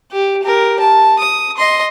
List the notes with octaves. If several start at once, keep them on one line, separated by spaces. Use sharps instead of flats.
G4
G4 A#4
A5
D#6
D#5 C6